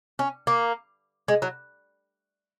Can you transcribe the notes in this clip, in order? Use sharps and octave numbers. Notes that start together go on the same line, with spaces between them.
C#4
A#3
G#3
F#3